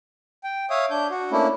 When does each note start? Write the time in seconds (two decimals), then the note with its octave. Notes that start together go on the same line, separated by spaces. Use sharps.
0.44 G5
0.70 C#5 E5 F5 D#6
0.91 D4 G6
1.10 F#4
1.32 A3 A#3 C#4 D4 E4